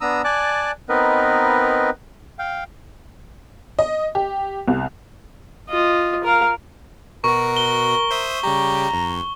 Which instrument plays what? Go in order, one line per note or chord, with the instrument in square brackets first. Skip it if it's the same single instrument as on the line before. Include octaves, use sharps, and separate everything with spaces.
[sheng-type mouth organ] B3 D4 A#5 D#6 E6
D5 G#5 A5 D6 F#6
B3 C4 D#4 A#4 B4 D#5
F5 G5
[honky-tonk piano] D#5
G4
C2
[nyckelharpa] F4 D#5
A#4 F5
[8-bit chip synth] B2 F#4 [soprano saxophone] A#4 [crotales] C#6
[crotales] G7
[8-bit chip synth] C5 E5 D#6
[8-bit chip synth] C#3 G3 G4 [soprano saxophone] A#5
[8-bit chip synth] F2